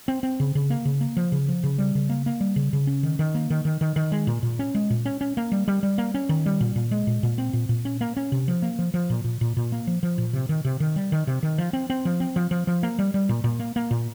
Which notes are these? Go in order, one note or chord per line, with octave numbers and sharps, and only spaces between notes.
C4
C4
C#3
C#3
A#3
C#3
A#3
F3
C#3
F3
C#3
G3
C#3
A#3
A#3
G3
C#3
C#3
C#4
D#3
D#3
A#3
D#3
D#3
D#3
D#3
G#3
A#2
A#2
C#4
G#3
A#2
C#4
C#4
A#3
G3
G3
G3
A#3
C#4
D#3
G3
A#2
A#2
G#3
A#2
A#2
C4
A#2
A#2
C#4
A#3
C#4
C3
F3
A#3
F3
F3
A#2
A#2
A#2
A#2
A#3
F3
F3
A#2
C3
D#3
C3
D#3
G3
D#3
C3
D#3
F3
C4
C4
F3
C4
F3
F3
F3
A#3
G3
G3
A#2
A#2
A#3
A#3
A#2